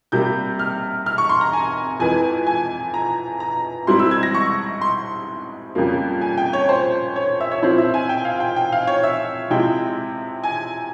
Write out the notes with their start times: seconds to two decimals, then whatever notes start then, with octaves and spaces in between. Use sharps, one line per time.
0.12 C3 G3 A#3 G6
0.59 F6
1.06 F6
1.18 C#6
1.29 C6
1.41 A#5
1.53 G#5
2.00 F2 E3 G#3 G#5
2.47 G#5
2.94 A#5
3.40 A#5
3.87 G#2 G3 C4 E4 C6
3.99 E6
4.11 G#6
4.23 A#6
4.34 C#6
4.81 C6
5.75 F2 C#3 G3 A#3
6.21 G#5
6.37 G5
6.53 C#5
6.69 C5
7.16 C#5
7.41 E5
7.51 C#5
7.62 A#2 F3 C4 E4 C5
7.78 E5
7.94 G#5
8.09 G5
8.25 F5
8.40 G5
8.56 G5
8.72 F5
8.87 C#5
9.03 E5
9.50 C3 F3 G#3 E4 G5
10.44 G#5